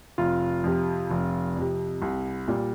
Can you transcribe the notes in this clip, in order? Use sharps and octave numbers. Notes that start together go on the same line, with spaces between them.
F1 F4
F2 C3
F1
F2 C3
C2
A#2 G3